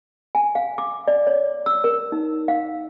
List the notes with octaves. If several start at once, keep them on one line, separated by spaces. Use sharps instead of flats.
G#5
F5
D6
D5
C#5
E6
A#4
D#4
F5